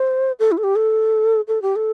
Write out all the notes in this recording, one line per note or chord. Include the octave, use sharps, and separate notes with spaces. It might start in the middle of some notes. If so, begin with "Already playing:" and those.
Already playing: C5
A4
E4
A4
G4
A4
A4
G4
A4